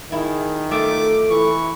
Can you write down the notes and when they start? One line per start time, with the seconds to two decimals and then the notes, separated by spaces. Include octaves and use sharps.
0.12 D#3 E4 G#4
0.71 A3 F4 E5 D6
1.30 E3 C#6